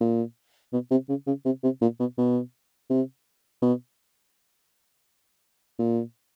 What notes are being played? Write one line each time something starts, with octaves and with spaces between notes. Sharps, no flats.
A#2
B2
C3
C#3
C#3
C3
C3
A#2
B2
B2
C3
B2
A#2